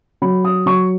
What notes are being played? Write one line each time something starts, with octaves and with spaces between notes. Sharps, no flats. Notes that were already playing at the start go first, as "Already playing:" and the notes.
F#3 B5
D#6
F#3 C#6